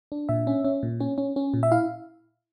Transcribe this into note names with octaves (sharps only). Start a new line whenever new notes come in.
D4
A#2 E5
C#4
C#4
A#2
C#4
C#4
C#4
A#2
E5
E4 F5